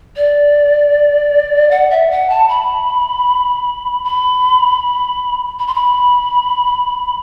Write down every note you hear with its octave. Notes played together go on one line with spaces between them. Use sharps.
D5
F#5
E5
F#5
A5
B5
B5
B5
C6
B5